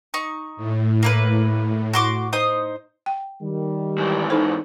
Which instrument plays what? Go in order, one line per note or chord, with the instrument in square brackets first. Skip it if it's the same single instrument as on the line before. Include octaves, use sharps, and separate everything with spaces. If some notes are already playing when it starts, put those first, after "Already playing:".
[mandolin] D#4 C#6
[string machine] A2
[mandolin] A#3 E4 B4
F#4 C6 D6
D#4 C5 D#6
[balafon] G5
[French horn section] D#3 G3
[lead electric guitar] G#2 E3
[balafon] D#4 A4 C5